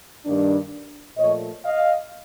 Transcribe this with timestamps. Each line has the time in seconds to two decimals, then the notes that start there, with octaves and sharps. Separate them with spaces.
0.25 G2 D#3 G3 A#3 D4
1.17 A#2 F3 A3 C#5 D#5
1.65 D#5 F5